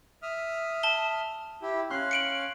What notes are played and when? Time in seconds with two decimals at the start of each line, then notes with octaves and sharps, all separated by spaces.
0.22 E5 D#6 F6
0.83 A5 G7
1.62 E4 G4
1.90 C#4 F5 C6 F#6
2.11 C#7 D7 F#7